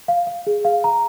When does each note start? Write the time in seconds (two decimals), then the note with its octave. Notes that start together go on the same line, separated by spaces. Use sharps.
0.08 F5
0.27 F5
0.47 G#4
0.65 F5
0.84 A#5